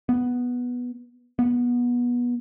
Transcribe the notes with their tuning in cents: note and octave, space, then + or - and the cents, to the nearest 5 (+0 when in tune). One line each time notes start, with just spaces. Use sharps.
B3 -5
B3 -25